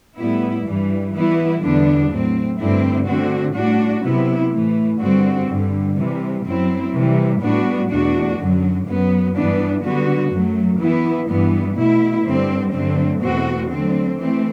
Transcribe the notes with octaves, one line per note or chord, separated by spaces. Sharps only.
A2 G3 B3 E4
G2 E3 G3
E3 G3 B3 E4
E2 D3 G3 B3 D4
A2 F#3 C4
G2 D3 A3 C4 E4
D3 A3 C4 F#4
A2 G3 D4 F#4
C3 F#3 B3 E4
A2 E3 A3
G2 D3 G3 C4 F#4
G2 D3 G3
C3 E3 G3
F#2 F#3 C4 E4
C3 E3 G3
A2 G3 B3 D4 F#4
E2 B2 A3 D4 F#4
F#2 D3 F#3
F#2 F#3 B3
G2 E3 B3 D4
D3 G3 B3 F#4
F#2 F#3 A3
E3 B3 E4
G2 E3 G3 B3
B2 A3 E4
G2 D3 G3 C4
G2 D3 F#3 A3 C4
E2 B2 A3 C4 F#4
D3 F#3 A3 C4
E3 A3 C4